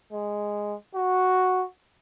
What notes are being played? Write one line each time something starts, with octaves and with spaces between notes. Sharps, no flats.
G#3
F#4